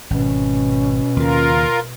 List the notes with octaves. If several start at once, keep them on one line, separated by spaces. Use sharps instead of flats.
G#1 B2 C#4
D#2 C#3 F4 A#4